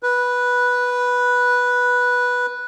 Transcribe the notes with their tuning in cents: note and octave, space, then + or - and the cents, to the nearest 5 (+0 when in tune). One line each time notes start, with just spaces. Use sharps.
B4 -5